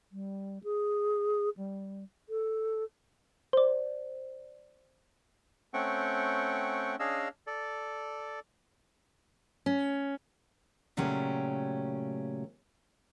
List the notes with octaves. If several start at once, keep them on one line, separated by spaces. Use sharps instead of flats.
G3
G#4
G3
A4
C5 D5
A3 C4 C#4 F#5 G5 C#6
C#4 D4 G#4 D#5 F5 E6
A4 D5
C#4
A#2 C#3 F#3 A3 C#4 G4